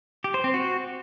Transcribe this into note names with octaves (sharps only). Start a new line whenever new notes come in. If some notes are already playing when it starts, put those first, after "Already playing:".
G4
C5
C4
F#4